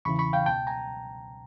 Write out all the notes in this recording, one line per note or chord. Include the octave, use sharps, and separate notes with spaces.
E2 C#3 E3 B5 C#6
B5 C#6
F5 G5
C#2 B2 G5 A5
G#5 A#5